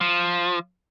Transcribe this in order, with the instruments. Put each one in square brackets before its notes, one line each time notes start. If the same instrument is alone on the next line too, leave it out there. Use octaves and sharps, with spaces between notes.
[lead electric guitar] F3